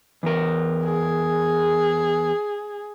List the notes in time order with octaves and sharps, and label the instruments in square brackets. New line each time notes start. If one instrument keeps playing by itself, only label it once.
[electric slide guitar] E2 A#4
[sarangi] G#4